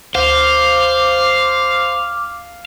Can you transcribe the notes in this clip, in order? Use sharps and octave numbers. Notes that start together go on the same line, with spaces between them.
D2 C5 F5 D6